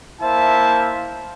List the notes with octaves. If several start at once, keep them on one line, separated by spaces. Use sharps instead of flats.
A#3 E4 C5 E5 F5 A5